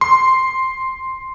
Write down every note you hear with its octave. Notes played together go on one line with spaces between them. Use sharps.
C6